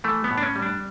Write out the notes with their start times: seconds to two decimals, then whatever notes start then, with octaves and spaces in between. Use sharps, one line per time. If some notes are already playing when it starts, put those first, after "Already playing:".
0.04 E3 A3
0.24 B3
0.31 A2
0.38 D4
0.43 C#4
0.56 G3
0.62 D4